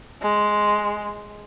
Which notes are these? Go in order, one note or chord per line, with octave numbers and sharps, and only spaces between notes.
G#3